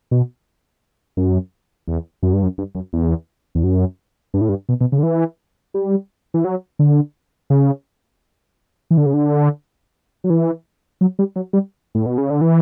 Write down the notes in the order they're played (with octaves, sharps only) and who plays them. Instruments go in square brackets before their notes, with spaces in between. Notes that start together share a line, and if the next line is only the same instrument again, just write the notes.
[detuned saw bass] B2
F#2
E2
F#2
G2
F#2
G2
F#2
E2
E2
F#2
G2
A2
G2
B2
B2
C#3
D3
E3
G3
E3
F#3
D3
C#3
E3
D3
C#3
D3
F#3
E3
F#3
G3
F#3
G3
A2
B2
C#3
D3
E3